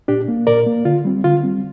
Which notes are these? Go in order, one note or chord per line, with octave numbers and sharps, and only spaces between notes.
A#2 D4 G4
A#3
A#2 A#4 D5
A#3
D3 F4
G3 C4
D3 F4
G3 C4